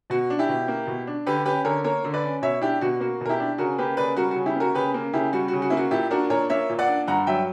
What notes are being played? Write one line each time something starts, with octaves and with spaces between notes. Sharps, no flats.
B2 F#4
D4
E4 G4
B2
A#3
B2
D4
D3 G4 B4
C#4 G4 B4
D3 A#4 C#5
A#3 A#4 C#5
D3
B4 D5
C#4
B2 C#5 E5
D4 E4 G4
B2 F#4
A#3 F#4
B2 A#4
E4 G4
D4
C#3 F#4 A#4
A#3 G4 B4
C#3 B4 D5
G3 F#4 A#4
F#4
C#3
E4 G4
A#3 F#4 A#4
C#3 G4 B4
A#3
C#3 E4 G4
G3 F#4
F#4
C#3
F#4
A#3 E4
F#4
A#2 E4 G4
D4 F#4 A#4
A#2 A#4 C#5
A#3 C#5 E5
A#2
D5 F#5
D4
G2 F#5 A#5
F#3 E5 G5